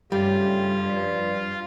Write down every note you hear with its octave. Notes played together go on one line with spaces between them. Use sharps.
G2 C#3 G3 A3 F4 G4
F3 B4 D5